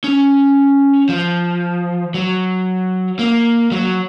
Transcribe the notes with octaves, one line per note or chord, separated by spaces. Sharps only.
C#4
F3
F#3
A#3
F#3